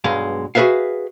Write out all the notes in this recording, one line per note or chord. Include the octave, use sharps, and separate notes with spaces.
B1 G2 G#3 F5
F#4 G#4 A4 B4 E5 F5